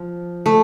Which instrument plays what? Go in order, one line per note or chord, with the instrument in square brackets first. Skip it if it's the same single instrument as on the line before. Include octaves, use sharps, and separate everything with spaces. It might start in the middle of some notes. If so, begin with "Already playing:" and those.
Already playing: [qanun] F3
A3